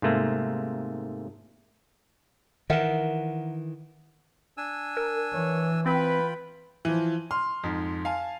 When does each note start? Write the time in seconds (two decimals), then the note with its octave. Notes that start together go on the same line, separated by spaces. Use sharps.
0.02 G#2 C3 A3 A#3
2.70 D#3 E3 A#4 E5 F#5
4.57 D4 G#5 E6
4.97 A#4
5.33 E3 C#5
5.86 C4 F4 B4 G5 B5
6.85 E3 F3 D#7
7.31 C6 F6
7.63 F2 G#2
8.05 F5 G#5 A5